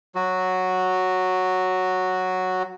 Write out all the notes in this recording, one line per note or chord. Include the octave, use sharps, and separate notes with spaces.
F#3 F#4